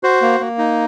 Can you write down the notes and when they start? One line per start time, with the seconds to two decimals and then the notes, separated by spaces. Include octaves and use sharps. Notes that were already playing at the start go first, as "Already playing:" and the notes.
0.03 F#4 C5
0.22 A#3
0.40 A#3
0.58 D#4